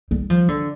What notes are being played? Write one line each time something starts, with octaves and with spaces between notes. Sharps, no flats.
G3
F3
D3